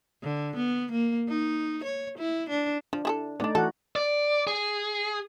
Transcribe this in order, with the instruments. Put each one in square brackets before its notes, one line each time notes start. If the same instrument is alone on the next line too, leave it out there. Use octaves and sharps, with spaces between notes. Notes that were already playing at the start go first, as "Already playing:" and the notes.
[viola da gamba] D3
B3
A#3
D#4
C#5
E4
D4
[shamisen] F3 [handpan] D4
[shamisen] E4 G#4 A4
[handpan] A3 D#4 D5 [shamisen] B3 D4
[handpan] E3 F#4 F#5 [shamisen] A4
[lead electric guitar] D5
G#4